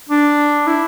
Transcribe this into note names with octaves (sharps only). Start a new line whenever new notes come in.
D4
E4